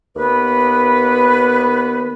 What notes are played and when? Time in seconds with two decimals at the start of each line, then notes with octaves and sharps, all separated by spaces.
0.16 D#2 B3 B4